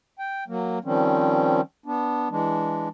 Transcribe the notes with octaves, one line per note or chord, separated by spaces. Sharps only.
G5
F#3 A#3
D#3 F3 G3 C4 C#4
B3 D4
E3 G#3 D4